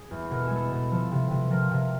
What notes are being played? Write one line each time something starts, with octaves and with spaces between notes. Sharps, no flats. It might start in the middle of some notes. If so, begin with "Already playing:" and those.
Already playing: G#4
E2
B2 A#4
A4
G#3 G#4
A4
B2
F3 A4
C3
C3
F3 A#4
C3